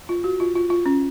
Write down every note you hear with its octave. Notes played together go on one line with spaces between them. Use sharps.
F4
F#4
F4
F4
F4
C#4